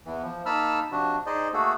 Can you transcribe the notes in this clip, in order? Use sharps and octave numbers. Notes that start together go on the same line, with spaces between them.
E2 E3
F3
A#3 D#4 A5 B5 E6 F6
C3 F3 D4 F#4
D#4 G#4 C5 D5 D#5
A3 A#3 F#4 G#4 A4